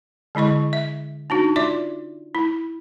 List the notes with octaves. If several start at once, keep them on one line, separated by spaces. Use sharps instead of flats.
D3 G#3 E4 D#5 C#6
E5
D4 D#4 F#4
F4 D5 E5 D6
E4